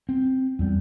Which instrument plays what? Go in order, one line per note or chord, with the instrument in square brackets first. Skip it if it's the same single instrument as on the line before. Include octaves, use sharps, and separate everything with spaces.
[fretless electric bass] C4
E2 G3